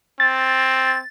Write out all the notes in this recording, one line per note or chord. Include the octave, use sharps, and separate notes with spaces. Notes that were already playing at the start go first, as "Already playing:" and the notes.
C4 A6